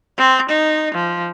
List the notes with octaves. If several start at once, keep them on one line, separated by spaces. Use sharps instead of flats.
C4
D#4
F3